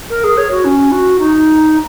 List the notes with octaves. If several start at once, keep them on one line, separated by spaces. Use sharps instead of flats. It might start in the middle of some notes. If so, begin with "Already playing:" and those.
A#4
G#4
C#5
F#4
C#4
F#4
D#4